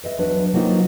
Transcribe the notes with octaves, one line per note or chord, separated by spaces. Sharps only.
B4 D#5 E5
E2 F#3 D4 B4
F#3 A#3 C4 D#4 F4